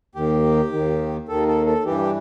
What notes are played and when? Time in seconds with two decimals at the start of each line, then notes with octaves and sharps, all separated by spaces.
0.15 D#2 D#3 G4
0.73 D#2 D#3
1.28 D#2 D#3 A4
1.48 A4
1.66 A4
1.85 G2 E3 G4